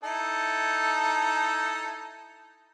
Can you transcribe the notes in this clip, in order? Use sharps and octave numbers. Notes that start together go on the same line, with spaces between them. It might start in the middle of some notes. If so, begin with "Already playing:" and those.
D#4 E4 A4